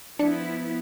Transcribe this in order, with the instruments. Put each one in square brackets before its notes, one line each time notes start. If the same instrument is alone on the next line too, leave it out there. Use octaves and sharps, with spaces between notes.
[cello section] F3 B3 E4 [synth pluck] D4 C#7